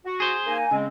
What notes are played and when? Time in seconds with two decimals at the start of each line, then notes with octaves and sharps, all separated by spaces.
0.05 F#4
0.20 G#4 C5
0.46 A#3 D#4 G#5
0.71 C#3 G#3 C4